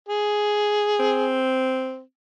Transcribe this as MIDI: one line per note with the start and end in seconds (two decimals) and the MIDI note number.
0.08 1.41 68
1.00 2.01 60